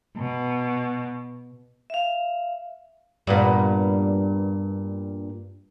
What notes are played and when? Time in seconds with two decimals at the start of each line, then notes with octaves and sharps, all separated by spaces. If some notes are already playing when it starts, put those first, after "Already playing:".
0.16 B2
1.90 E5 F5
3.27 G2 A#2 B3